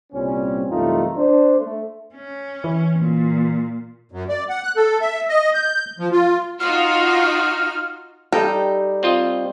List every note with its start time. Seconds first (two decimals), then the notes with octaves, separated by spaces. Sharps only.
0.13 C2 A#2 G3 C4 C#4
0.70 C2 F#2 E3 A3 D#4 F4
1.16 D4 C5
1.58 A3
2.15 C#4
2.64 E3
2.99 A#2
4.12 F#2
4.29 D5
4.49 F#5
4.64 F#6
4.76 A4
5.01 E5
5.29 D#5
5.54 G6
5.99 F3
6.12 F4
6.60 D#4 F4 F#4 F6
8.32 G3 D#4 G4 A4 G5
9.03 C4 F4 D#5